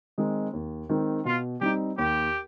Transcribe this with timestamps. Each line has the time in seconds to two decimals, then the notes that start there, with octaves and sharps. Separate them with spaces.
0.18 D#3 G#3 C4 D#4
0.53 D#2
0.89 D#3 G#3 C4
1.25 B2 F4
1.61 G3 C4 D#4 G4
1.98 D#2 G4